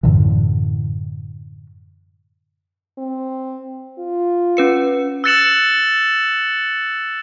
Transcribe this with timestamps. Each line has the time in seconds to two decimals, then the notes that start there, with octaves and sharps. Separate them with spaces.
0.03 F#2 A2 D3 E3
2.98 C4
3.99 F4
4.57 C#4 B4 C#7
5.24 E6 F#6 A6 C#7 E7 F#7